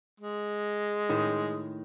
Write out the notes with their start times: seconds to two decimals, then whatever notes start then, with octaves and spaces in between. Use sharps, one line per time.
0.20 G#3
1.09 A2 D#3